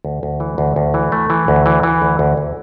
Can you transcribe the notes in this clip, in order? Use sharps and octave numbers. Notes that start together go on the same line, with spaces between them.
D2
D2
E3
D2
D2
E3
A3
E3
D2
E3
E3
D2
D2
D2